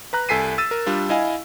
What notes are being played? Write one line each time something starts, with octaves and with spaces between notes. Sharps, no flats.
B4 A#5 F#6
C2 A4 G#5 B6 C7 D#7
E6 A6 D#7
A#4
G3 D4 F4
E4 D#5 F5 G#5